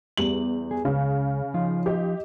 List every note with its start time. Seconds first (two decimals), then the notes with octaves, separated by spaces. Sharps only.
0.17 E2 G3 F#7
0.71 G#4
0.85 C#2 C#3
1.54 F3 D#4 F4
1.86 G4 D#5